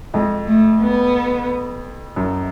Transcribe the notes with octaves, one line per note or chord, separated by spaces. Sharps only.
F2 G#3
A3
B3
F#2